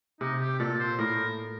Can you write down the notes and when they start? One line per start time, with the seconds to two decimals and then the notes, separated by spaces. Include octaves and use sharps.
0.21 C3 D#4
0.40 G4
0.59 A#2 A4
0.80 C5
0.99 A2 A#4